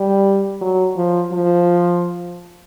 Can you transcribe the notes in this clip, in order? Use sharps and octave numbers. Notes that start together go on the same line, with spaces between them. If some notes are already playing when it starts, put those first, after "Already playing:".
Already playing: G3
F#3
F3
F3